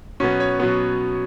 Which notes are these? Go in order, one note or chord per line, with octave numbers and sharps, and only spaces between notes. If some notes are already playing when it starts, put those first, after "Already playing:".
B2 F#3 B3 C#4
C#5
B2 F#3 B3